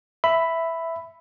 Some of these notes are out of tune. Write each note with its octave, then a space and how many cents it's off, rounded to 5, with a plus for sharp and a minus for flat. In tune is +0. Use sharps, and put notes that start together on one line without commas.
E5 +0 B5 +10